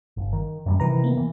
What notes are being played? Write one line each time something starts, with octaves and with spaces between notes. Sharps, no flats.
G1
D#3
F#2 F#3 G3
C3 D#3 E3 B4 A#5
A#3 B3
E3